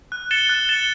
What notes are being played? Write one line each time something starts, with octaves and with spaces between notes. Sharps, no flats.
F#6
A6 C#7 E7 G7
F#6
A6 C#7 E7 G7